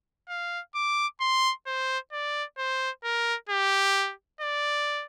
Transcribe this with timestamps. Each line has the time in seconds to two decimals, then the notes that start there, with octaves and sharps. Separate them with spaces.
0.29 F5
0.75 D6
1.21 C6
1.66 C5
2.12 D5
2.58 C5
3.04 A#4
3.49 G4
4.41 D5